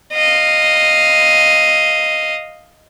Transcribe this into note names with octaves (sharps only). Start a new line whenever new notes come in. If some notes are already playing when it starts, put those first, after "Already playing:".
D#5 F5